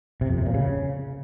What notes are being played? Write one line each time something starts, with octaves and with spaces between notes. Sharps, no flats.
C3
F2
C3
A#2
C#3